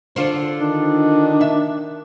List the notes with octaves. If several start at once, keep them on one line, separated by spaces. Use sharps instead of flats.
D3 D4 F4 C5
D#3 D4
E5